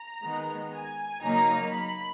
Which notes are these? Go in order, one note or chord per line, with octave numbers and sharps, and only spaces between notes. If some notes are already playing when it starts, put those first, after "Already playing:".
Already playing: A#5
D#3 G#3 B3 D#4
G#5
C#3 F#3 A#3 D#4 A#5
B5